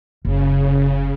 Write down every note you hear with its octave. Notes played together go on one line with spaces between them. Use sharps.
F#1 C#3